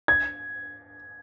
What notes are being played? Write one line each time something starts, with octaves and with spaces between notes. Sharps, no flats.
G#6